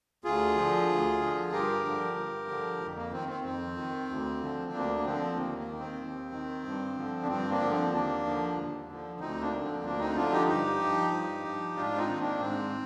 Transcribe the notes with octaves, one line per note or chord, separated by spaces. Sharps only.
D2 F4 G#4
D3 F3
D2
D3 F3
G2 G4 A#4
D3 F3
G2
D3 F3
F2
A#3
D#3 C4
C4
F2 C4
D#3
D2
D3 F3
D2 A#3 D4
A#3
D3 F3 C4
D#2 A#3
A#3
D#3
C4
D#2
D#3
G2
D3 F3
D4
G2 C4
A#3 D4
D3 F3
C4
D#2 A#3 D4
D3 F3
D#2
D3 F3
D2 C4 D#4
A#3 D4
D3 F3
C4
D2 A#3 D4
C4 D#4
D3 F3 D4 F4
D#4 G4
G2 D#4 G4
F3
G2
F3
G#2 D4 F4
C4 D#4
D#3
A#3 D4
G#2 C4